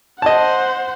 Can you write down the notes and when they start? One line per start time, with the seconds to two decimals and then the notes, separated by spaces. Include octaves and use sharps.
0.22 C5 D#5 F#5 A5